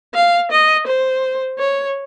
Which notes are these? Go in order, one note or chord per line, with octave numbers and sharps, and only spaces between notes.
F5
D#5
C5
C#5